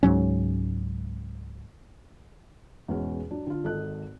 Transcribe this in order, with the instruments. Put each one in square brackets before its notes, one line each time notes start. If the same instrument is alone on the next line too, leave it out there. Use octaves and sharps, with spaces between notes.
[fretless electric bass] C#2 G#2 F#3 C#4
[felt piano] E2 G#2 B2 G#3 C#4
F#3 D4
D3 F4
G#1 A4 D#5 F#6